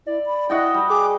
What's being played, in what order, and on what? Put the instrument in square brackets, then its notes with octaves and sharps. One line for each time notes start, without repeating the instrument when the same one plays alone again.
[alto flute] E4 [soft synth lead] D5
[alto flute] B5
[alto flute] E4 [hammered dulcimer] F#4 D#5 G5
[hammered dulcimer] G3
[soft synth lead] G#4 [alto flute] G#5 [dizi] D6